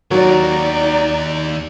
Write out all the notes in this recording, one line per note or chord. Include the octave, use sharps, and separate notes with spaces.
D#2 F#3 D#4 D5